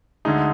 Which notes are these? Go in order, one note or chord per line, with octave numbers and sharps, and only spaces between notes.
D2 D3 G#3 D#4